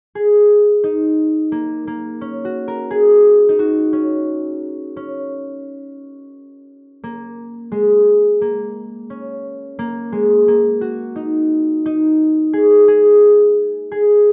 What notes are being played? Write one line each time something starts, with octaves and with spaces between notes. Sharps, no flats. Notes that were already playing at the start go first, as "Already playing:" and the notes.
G#4
D#4
A#3
A#3
C#4
F#4
A#4
G#4
D#4
F#4
C#4
C#4
A#3
G#3
A#3
C#4
A#3
G#3
A#3
F#4
D#4
D#4
G#4
G#4
G#4